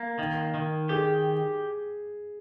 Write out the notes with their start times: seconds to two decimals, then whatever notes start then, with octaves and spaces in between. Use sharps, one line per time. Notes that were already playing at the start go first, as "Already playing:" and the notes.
Already playing: A#3
0.19 D#3
0.54 D#3
0.89 G4 G#4